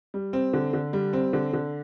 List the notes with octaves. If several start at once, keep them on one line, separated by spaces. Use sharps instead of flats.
G3
C4
D3
D3
G3
C4
D3
D3